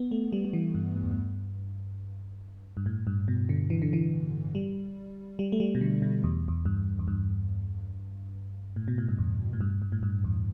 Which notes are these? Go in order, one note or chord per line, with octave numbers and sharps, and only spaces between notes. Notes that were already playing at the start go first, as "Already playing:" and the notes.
Already playing: B3
A3
G3
G3
E3
G2
G2
E2
G2
G2
A2
G2
B2
D3
E3
D3
E3
G3
G3
A3
G3
B2
D3
B2
E2
E2
G2
E2
G2
A2
B2
A2
G2
E2
A2
G2
G2
A2
G2
E2